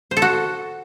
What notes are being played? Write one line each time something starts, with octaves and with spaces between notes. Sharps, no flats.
C5
A4
F#4